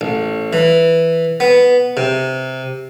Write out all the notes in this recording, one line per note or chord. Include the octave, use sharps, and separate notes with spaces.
A1
E3
B3
C3